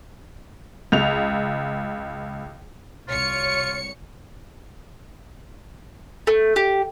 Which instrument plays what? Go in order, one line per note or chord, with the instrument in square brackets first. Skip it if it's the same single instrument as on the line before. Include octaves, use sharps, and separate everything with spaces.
[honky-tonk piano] C#2 F7
[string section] C2 C#5 C#7 [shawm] F4
[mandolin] A3
G4